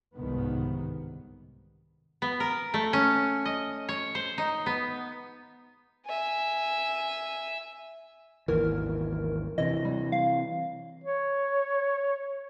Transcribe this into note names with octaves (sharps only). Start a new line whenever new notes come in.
G1 C2 G#2 D#3 B3
B3
A#4
A3
C#4
D#5
C#5
C5
D#4
B3
E5 G#5
G#1 D#2 E3 A#4
C3 E3 D#5
G3
F5
C#5